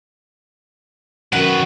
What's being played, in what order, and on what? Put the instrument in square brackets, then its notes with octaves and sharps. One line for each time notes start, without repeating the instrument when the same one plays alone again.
[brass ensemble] F#2 [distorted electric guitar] D#3 B4 [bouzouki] F#4